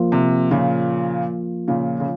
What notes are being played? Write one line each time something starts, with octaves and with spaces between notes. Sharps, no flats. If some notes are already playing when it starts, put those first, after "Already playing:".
Already playing: F3 A#3 F4
C3
A#2 C#3
A#2 C#3
C#3